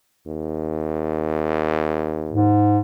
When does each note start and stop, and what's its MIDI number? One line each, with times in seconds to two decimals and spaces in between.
0.27 2.62 39
2.31 2.81 44